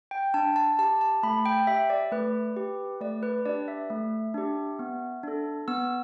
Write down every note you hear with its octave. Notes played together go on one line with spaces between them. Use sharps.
G5
D4 A5
A5
G4 A5
A5
A3 B5
G5
G4 E5
D5
A3 B4
G4
A3 D5
B4
D4 G4 D5
E5
A3
D4 G4
B3
D4 A4
B3 E6